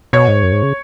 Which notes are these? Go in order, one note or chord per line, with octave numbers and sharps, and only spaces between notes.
B2 C#5
G#2
F#2
G#2
C#3